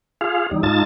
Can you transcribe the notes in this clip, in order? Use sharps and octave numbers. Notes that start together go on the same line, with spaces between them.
F4 G#4 F5
E2 G3 D#4
G#2 D#4 F4 A5 A6